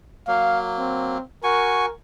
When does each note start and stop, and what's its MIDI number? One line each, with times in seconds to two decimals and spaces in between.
0.28 1.18 54
0.28 1.18 58
0.28 0.60 77
0.78 1.23 60
1.44 1.86 66
1.44 1.93 70
1.44 1.86 80
1.44 1.86 85